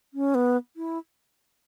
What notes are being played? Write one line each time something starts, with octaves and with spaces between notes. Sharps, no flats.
C#4
B3
E4